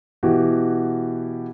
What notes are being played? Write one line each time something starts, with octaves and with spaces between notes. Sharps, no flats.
B2 E3 E4 F#4 G4